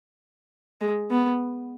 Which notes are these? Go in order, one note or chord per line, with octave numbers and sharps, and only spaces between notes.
G#3
B3